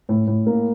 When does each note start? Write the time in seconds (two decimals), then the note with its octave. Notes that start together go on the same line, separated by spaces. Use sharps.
0.09 A2
0.27 A2
0.46 A#3